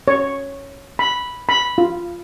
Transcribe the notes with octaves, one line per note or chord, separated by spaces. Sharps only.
C#5
B5
B5
F4